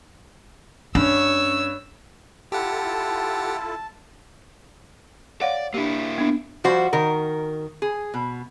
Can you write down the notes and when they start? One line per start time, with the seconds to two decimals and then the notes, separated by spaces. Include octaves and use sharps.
0.95 G2 C#4 C#5 E6
2.52 E4 F4 G4 A4 F#5 A5
5.41 C#5 D5 F5 F#5
5.74 A#3 D4 E4 G4
6.18 B3 D4
6.64 F3 G3 F#4 C5
6.93 D#3 A#4
7.82 G#4
8.14 B2